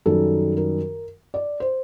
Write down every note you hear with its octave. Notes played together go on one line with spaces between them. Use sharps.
F#2 D#3 G3 A4
A#4
D5
C5